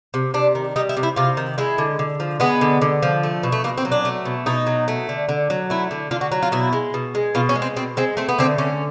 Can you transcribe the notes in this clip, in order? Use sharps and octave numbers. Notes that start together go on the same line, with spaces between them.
C3
C3 D4
D#3
G3 D#4
E4
C3
E4
C3 F4
D#3
G#3 E4
D3
D3
F3
G#3 B3
D3
D3
F3
A3
B2
A3
B2 A#3
C4
F#3
D4
A3
B2
B2 D#4
F#3
A3
D3
D3
F#3
A3 E4
D3
D3 F4
F#4
F#3
F4
B2 E4
G#3
B2
G#3
B2 F4
C#4
G#3
C4
B2 C4
G#3 C4
A3 C4
B3
D3 C4
D3 C#4